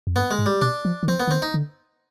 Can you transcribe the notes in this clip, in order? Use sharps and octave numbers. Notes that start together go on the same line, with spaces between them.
F2
G2 B3
G#3
G#2
G3
B2 D4
F3
D#3
F3 C4
B3
D3
D#3 C4
D#4
D3